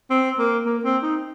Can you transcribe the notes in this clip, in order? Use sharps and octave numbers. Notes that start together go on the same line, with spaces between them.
C4
A#3
A#3
C4
D#4